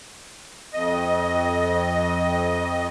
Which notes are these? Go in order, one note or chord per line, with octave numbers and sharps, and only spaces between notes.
F2 D#5